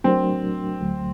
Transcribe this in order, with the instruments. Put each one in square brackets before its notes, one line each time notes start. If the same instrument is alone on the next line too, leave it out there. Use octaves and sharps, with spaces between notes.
[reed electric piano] F#3 A3 D4 F#4 A#4 [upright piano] C4
[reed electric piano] D2 D3 F#3 A3